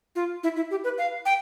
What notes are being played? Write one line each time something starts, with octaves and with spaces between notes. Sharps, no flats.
F4
E4
E4
G4
B4
F5
G5